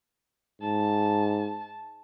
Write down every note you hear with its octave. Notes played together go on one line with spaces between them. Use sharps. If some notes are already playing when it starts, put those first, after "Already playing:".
G#2 A5